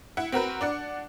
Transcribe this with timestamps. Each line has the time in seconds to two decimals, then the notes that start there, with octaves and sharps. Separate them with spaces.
0.17 E4 F#5
0.32 C4 F#4 A#4 B4
0.61 D4 D5 F#5